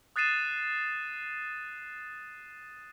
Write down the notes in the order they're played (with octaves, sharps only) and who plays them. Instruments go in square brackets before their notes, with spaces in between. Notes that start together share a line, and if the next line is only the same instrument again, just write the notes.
[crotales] D#6 F#6 A6 C7 D#7 E7